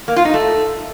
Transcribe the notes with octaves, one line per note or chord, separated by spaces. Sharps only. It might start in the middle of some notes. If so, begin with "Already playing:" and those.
A#3
F4
D#4
A3